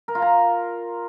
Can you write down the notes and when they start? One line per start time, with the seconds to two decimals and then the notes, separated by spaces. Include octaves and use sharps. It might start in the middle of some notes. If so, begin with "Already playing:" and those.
0.08 A#4
0.15 F4
0.22 A#5